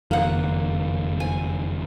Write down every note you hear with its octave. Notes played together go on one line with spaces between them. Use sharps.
F#1 F2 D#3 A#3 F#5
G#5